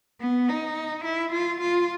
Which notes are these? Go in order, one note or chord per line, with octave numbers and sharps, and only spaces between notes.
B3
D#4
E4
F4
F4